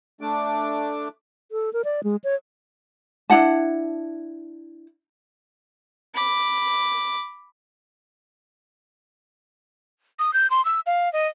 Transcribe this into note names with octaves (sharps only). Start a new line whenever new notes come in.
A3 D4 D6
A4
A#4
D5
G#3
C#5
D4 E4 F#5 A5
B5 D6
D#6
G6
C6
E6
F5
D#5